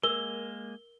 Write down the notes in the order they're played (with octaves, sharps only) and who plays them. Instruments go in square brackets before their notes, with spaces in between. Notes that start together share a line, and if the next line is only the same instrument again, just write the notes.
[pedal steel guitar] G#3 A#3 [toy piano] A#4 E6 [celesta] G7